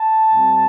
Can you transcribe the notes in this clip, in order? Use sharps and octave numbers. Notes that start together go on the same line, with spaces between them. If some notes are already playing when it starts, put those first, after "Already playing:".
Already playing: A5
A2 G3 C4